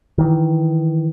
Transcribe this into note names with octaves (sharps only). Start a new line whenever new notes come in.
D#3 E3